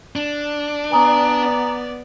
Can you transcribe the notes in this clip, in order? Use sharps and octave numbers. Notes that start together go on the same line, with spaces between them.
D4
B3 D5 G#5 A#5 D#6